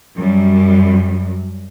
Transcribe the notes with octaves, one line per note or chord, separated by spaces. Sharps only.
F#2 G3